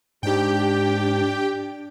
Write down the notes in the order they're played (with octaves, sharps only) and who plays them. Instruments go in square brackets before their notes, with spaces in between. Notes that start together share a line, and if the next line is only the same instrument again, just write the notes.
[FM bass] G#2 [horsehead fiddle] D4 [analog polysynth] G4 G5